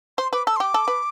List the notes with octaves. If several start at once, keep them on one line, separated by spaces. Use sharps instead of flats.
C5 C6
B4 D6
A4 E6
C6
G4 D6
A4
B4